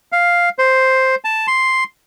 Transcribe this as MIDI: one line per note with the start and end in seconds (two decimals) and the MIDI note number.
0.12 0.49 77
0.59 1.15 72
1.25 1.47 81
1.48 1.84 84